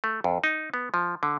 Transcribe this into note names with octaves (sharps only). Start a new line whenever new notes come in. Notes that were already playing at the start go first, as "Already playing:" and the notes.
A3
F2
D#4
B3
F3
D3